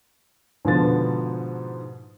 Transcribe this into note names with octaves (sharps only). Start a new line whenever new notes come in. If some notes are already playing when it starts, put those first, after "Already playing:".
G#2 B2 D3 F3 B3 A6